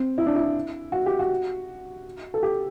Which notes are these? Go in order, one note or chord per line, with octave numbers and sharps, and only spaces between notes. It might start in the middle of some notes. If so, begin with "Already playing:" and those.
Already playing: C4
E4
D4
E4
F#4
G4
F#4
A4
G4